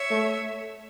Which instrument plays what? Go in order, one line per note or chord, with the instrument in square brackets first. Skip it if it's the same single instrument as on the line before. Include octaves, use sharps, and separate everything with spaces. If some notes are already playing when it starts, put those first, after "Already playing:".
Already playing: [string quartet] C#5 E5
[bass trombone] A3